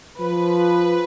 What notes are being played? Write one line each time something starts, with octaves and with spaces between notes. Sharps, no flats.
F3 B4